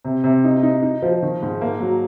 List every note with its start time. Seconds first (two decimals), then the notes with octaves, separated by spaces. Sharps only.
0.05 C3
0.24 C3
0.44 D#4
0.63 D#4
0.82 D#4
1.02 F3
1.22 D#3
1.42 G#2
1.61 A#3
1.80 F#3